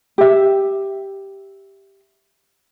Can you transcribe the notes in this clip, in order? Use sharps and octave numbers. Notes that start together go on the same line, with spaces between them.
G4 E5